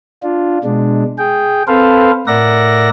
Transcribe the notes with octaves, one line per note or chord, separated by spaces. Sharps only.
D4 F4
B2 G#3 D4
G#4 G5
C4 A4 B4 C5 F5
A2 A#4 D5 E5 F#5 A#6